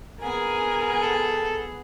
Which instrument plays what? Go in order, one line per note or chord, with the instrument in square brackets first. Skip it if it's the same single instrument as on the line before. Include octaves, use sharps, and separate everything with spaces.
[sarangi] B3 [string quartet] G#4 [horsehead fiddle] A#4 G#5
[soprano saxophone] A4